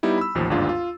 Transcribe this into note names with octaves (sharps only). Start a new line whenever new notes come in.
G3 B3 D#4 E4 G4
B5 E6
A1 D#2 F3
G1 D#2 G#2 D4 F4
F4